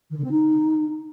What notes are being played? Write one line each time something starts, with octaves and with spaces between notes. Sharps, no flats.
D#3
D3
C4
D#4